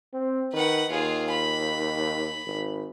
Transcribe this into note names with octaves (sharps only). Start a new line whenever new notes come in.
C4
D#3 B4 F#5
D#2 F4 G#4
B5
G#1